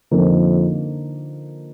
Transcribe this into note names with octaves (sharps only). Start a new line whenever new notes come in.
F2 D3 F3 A#3 D#4